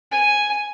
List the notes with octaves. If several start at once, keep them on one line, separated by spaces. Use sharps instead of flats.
G#5